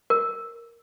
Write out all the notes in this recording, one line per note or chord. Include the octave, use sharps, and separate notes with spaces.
A#4